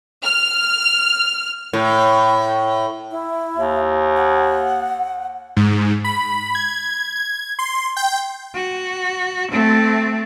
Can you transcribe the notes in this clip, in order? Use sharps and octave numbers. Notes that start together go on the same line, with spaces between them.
F6
A2
E4
D#2
F#5
G#2
B5
G#6
G#6
C6
G5
F#4
A3 C4